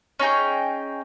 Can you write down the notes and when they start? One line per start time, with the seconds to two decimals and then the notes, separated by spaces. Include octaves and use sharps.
0.20 C#4 D#4 G#4 G5